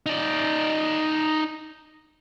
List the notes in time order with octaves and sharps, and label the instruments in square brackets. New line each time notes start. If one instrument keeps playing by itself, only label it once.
[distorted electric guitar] D#4 D5